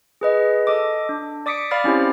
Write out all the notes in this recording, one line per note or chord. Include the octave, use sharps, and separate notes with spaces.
G#4 B4 D#5
A4 D#5 D6
D4
D5 D6 D#6 B6 C#7 D7
D5 F5 B5 F6 A6
C4 C#4 E4 G4 C5